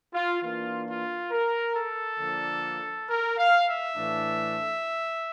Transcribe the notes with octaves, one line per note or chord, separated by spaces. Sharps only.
F4
E3 A#3 D4 F4
F4
A#4
A4
D3 F3 A#3 D4
A#4
F5
E5
A2 E3 A3 D4